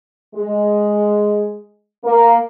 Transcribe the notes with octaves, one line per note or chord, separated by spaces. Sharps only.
G#3
A#3